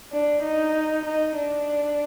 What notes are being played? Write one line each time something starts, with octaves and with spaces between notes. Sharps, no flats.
D4
D#4
D#4
D4